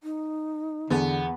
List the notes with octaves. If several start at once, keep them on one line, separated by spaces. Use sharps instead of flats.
D#4
E2 D3 B3